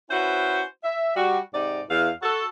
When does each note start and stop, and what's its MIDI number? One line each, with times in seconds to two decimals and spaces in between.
0.10 0.61 61
0.10 0.61 64
0.10 0.61 66
0.10 0.61 71
0.10 0.61 72
0.83 1.14 76
1.15 1.38 55
1.15 1.38 66
1.53 1.81 44
1.53 1.81 48
1.53 1.81 63
1.53 1.81 74
1.89 2.10 40
1.89 2.10 77
2.22 2.45 66
2.22 2.45 69